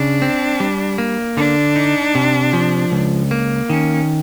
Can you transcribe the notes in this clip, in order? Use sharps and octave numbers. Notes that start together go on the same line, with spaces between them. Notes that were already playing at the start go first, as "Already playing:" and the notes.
Already playing: C#3 D4
C4
G3
A#3
D3 D4
D#4
C3
F3
C#2
A#3
D#3 C#4